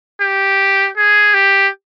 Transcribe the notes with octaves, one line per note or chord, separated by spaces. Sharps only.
G4
G#4
G4